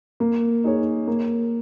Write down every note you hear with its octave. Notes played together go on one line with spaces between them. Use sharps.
A#3
D#4 G#4 C#5
A#3